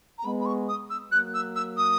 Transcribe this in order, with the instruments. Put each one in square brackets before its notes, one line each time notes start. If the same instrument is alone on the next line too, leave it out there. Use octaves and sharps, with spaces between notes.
[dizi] A#5
[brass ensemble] G#3 B3 [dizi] B5
[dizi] B5
C#6
D#6
E6
[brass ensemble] F#3 A#3 [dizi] F#6
[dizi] E6
E6
D#6